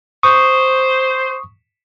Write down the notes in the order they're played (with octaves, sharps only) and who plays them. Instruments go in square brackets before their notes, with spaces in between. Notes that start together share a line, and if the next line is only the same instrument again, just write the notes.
[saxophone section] C5 [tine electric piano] C#6 D#6